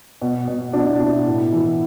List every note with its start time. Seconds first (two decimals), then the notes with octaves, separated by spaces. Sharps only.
0.22 B2
0.48 B2
0.73 B2 D4
0.87 E4
1.00 B2 D4
1.13 E4
1.26 A2
1.52 E3